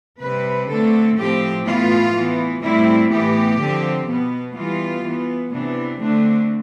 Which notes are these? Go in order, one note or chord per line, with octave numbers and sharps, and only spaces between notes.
C3 G3 C4 B4
D3 A3 C4 A4
A2 F3 C4 G4
A2 E3 B3 F4
E3 B3
A2 G3 C4 E4
A2 E3 B3 G4
D3 F3 C4
B2 B3
E3 G3 B3 F4
E3 B3
C3 E3 B3 D4
D3 A3 C4 D4